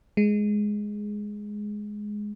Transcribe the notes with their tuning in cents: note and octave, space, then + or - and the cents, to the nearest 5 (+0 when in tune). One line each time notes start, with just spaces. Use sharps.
G#3 +5